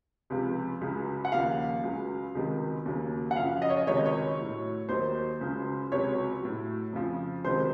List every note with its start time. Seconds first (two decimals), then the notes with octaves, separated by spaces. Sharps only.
0.30 C#2 C3 F3
0.81 C#2 C#3 F#3
1.25 F#5
1.32 D#2 C#3 F3 F5
1.83 C#2 C#3 F#3
2.35 C#2 C3 D#3 F#3
2.86 D#2 C#3 F#3
3.31 F#5
3.36 F#2 C#3 F3 F5
3.62 D#5
3.70 C#5
3.77 D#5
3.87 C#2 C3 D#3 F#3 C#5
3.97 D#5
4.06 C#5
4.38 A2 F#3
4.89 D#2 D#3 F#3 C5
5.41 C#2 C#3 F#3
5.92 C#2 C3 F#3 C#5
6.42 A2 F#3
6.93 F2 C#3 F3
7.44 C#2 C3 D#3 F#3 C5